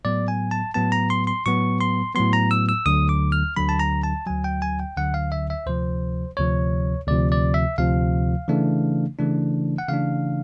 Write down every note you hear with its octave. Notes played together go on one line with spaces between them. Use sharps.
A2 F#3 B3 D5
G#5
A5
A2 F#3 B3 A5
A#5
C6
C6
A2 F#3 B3 C#6
C6
A2 F#3 B3 C6
A#5
E6
E6
D2 D3 F#3 D#6
D6
F6
D2 D3 F#3 B5
A5
A#5
A5
D2 D3 F#3 G#5
G5
G#5
G5
D2 D3 F#3 F#5
F5
E5
E5
D2 C3 F3 C5
D2 C3 F3 C#5
D2 C3 F3 D5
D5
E5
D2 C3 F3 F5
C#3 E3 A3 D4
C#3 E3 A3 D4
F#5
C#3 E3 A3 D4 F5